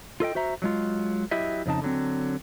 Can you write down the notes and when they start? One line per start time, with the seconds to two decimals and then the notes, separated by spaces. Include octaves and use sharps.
0.20 F4 A4 D#5 G5
0.35 F#4 C5 E5 A#5
0.62 F#3 G#3 F4
1.31 F#3 E4 G4 D#5 E5
1.66 F2 C#3 D#4 A5
1.82 D3 F#3 C4